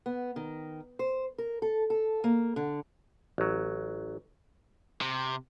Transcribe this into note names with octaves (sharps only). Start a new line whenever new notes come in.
B3
D#3
C5
A#4
A4
A4
A#3
D3
A1 F#3
C3